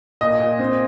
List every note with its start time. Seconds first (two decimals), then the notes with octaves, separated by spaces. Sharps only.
0.21 A#2 D#5
0.40 A#2
0.59 C4